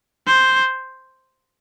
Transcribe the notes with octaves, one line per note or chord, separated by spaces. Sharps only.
C5